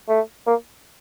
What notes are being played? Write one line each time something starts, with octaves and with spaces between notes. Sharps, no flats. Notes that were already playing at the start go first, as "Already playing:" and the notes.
A3
A#3